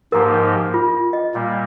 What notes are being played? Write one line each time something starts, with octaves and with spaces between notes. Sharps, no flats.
G#2 F3 A#3 D#4 G4 A#4
F4
D#5
A#2 G3 A#3